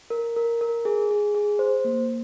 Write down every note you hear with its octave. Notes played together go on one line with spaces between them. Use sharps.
A#4
A#4
A#4
G#4
G#4
G#4
C5
A#3